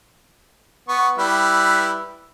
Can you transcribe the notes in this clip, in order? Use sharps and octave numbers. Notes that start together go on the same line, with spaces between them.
B3 C#6
G3 E4 B4